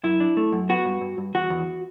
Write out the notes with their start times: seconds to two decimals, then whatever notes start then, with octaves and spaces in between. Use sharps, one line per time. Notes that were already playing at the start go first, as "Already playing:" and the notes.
0.04 F#2 E4
0.20 D4
0.37 A3
0.52 F#2
0.69 B3 F#4
0.85 G2
1.01 G2
1.18 G2
1.35 E2 F#4
1.50 E2